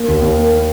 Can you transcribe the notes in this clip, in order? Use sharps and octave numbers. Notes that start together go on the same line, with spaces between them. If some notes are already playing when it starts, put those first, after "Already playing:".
Already playing: A#3
D#2
D#2
A#3
A#3